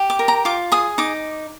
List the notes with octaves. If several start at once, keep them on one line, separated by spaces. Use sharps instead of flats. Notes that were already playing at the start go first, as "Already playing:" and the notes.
Already playing: G4
D6
A#4
A#5
F4 D6
G#4 D#6
D#4 D6